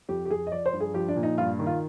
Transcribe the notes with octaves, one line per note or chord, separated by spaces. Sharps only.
F2 G4
G4
F2 G#4
D#5
F3 D5
C5
G2
G#4
F3 G4
D4
A#2
D#4
G2 F4
D#3
F4